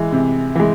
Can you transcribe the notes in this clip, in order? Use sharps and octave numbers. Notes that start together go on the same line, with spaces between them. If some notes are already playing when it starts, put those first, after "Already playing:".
Already playing: E3 G#3
C3
E3 G#3